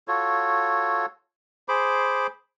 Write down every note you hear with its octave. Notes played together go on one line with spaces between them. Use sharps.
F4 F#4 A4 C#5
G#4 C5 B5 D6